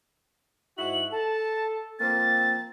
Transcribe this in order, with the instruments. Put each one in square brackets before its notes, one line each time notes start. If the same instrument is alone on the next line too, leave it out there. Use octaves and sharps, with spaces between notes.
[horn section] G#2 E4 F#4 [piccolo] F#7
[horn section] A4 [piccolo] A5
[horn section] F3 A#3 C4 [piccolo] A6